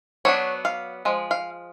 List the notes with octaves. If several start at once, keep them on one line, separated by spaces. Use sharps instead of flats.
F#3 B3 D4 C#5
F5
F3 G#3
F5